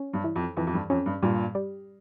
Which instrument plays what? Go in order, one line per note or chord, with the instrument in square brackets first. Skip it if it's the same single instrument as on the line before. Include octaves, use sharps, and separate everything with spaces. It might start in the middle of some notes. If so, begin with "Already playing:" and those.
Already playing: [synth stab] C#4
[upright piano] G2
[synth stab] E3
[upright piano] F2
[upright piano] F2 [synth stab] E3
[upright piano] F2
G2
[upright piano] F2 [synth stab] C#4
[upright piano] G2
[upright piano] G2 A#2 [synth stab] G3
[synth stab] G3